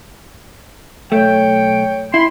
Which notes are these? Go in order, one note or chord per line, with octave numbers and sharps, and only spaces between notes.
B1 A3 C#5 G5
E4 B5 C6